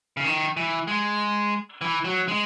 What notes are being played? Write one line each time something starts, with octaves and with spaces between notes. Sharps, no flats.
C#3
D#3
E3
G#3
E3
F#3
G#3